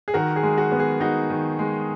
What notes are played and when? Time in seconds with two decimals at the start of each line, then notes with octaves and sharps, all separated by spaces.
0.08 G#4
0.14 D#3 F#4 A#4
0.36 G#4
0.43 G#3
0.58 F#4
0.72 B3
0.80 G#4
1.00 D#4 F#4
1.30 D#3
1.59 G#3